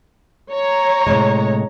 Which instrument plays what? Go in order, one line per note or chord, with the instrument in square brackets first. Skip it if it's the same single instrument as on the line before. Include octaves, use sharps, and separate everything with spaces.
[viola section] C#5 A#5
[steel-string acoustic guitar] A2 C3 G#3